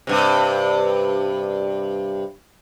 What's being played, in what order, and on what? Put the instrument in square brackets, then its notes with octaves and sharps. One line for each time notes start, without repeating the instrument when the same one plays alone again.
[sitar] G2 C3